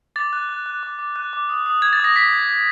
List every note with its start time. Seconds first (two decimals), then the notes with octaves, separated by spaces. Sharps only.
0.16 D6 A6
0.33 F#6
0.49 F#6
0.66 F#6
0.83 D6
0.99 D6
1.16 F#6
1.33 D6
1.49 D#6
1.66 D#6
1.82 G6 G#6
1.93 A6
2.00 D#6 A#6
2.16 D#6 B6
2.33 G6
2.49 G6